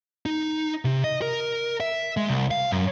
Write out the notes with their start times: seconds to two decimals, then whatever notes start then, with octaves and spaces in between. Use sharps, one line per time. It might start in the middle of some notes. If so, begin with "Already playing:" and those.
0.26 D#4
0.85 C3
1.04 D#5
1.22 A#4
1.80 E5
2.17 G#3
2.28 C2
2.51 F5
2.72 F#2